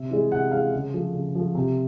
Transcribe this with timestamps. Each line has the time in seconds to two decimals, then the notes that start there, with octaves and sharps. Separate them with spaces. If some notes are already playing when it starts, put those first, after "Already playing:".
Already playing: C3 E5
0.11 E3 G#3
0.31 C3 F#5
0.51 E3 G#3 F5
0.73 C#3
0.94 F3 A3
1.14 C#3
1.35 F3 A3
1.55 C3